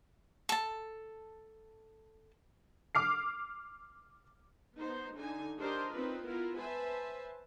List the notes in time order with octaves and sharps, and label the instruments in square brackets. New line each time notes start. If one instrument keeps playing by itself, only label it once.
[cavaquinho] A4 A5
[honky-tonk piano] D6 F6 C7
[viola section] B3 D#4 C5
D3 D#4 G#5
D4 D#4 G4 A#4 C5 D#5
C4 D#4 F4 B4
B3 E4 F4 A#4
B4 C5 E5 G#5 A5